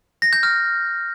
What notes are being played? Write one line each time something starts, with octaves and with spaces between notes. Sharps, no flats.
A#6
G6
F6